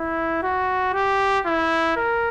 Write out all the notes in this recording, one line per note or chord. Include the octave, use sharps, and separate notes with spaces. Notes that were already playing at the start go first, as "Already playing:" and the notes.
Already playing: E4
F#4
G4
E4
A#4